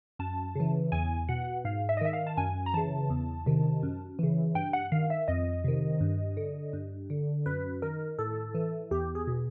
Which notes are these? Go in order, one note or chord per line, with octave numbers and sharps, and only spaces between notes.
F#2 A5
C#3 E3
E2 G#5
B2 F#5
G#2 F5
E5
D#5
D#3 E5
F5
A5
F#2 G#5
A#5
C#3 E3 A5
E2
C3 D#3
F#2
C#3 E3
G2 G5
F#5
D#3 F5
E5
F2 D#5
C3 D#3
G2
D3
G2
D3
F#2 B4
D#3 A#4
A2 A4
E3
E2 G4
G#4
B2